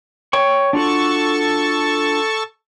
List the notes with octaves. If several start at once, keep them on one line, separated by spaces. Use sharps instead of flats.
C#5 G5 C#6
D4 F4 F#4 A4 A5 C#6